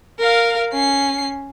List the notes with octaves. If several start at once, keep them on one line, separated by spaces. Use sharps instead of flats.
A#4 F5
C#4 C7